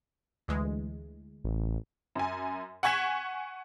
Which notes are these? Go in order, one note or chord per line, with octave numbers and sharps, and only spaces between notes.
D2 E3 G#3
A1
F#2 G#5
F#5 G#5 C#6 G#6 B6 E7